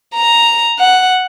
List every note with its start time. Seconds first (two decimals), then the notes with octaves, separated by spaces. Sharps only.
0.15 A#5
0.79 F#5